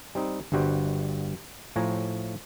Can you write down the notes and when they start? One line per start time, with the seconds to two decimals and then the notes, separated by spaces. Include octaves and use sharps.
0.15 G3 C4 D#4
0.52 G1 G2 G3 F#4 C5
1.76 A2 F3 C#5 G#5 A#5